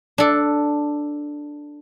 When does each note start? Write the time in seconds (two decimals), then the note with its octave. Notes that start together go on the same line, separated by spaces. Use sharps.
0.18 D4 A4